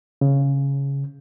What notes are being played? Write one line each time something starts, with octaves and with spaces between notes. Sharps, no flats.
C#3